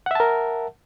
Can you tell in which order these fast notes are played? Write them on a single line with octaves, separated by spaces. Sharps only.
F#5 E5 A5 A#4